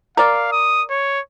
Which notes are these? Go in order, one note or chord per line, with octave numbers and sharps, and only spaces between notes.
A#4 D5 F5
D#6
C#5